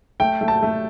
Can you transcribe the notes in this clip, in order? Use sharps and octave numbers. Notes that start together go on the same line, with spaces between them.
A3 G5
A3
A5
A3